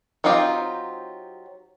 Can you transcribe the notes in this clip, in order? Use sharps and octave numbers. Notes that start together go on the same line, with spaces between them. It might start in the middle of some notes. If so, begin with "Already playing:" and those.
F#3 C4 D#4 F4 G4